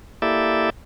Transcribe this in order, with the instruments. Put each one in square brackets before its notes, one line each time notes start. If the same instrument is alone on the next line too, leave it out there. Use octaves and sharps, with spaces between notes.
[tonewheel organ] A#3 E4 G4 A4 D5 E5